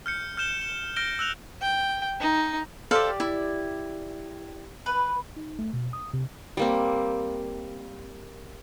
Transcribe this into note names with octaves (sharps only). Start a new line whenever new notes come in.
F6 G6 C#7
F6 G6 E7 G7
E7
F6 G6 A#6 D7 G7
E6 F#6 F7
G5
D#4
G4 A4 C5 D5 F5
E4
B4
D#4
A3
B2
D#6
C3
G3 A#3 C4